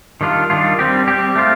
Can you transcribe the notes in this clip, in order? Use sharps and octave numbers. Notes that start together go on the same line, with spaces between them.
D#3 G3 D4 F4
D#3 G3 D4 F4
G3 C4 G4
G3 C4 G4
A3 C4 F4